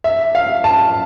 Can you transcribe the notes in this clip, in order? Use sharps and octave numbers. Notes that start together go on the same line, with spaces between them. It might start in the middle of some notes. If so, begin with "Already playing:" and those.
E5
F5
A5